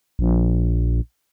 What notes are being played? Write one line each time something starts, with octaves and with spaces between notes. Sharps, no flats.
A#1